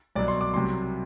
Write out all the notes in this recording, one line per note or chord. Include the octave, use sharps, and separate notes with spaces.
C2 B2 F#3 D5
C6
D6
C2 C3 F#3 C6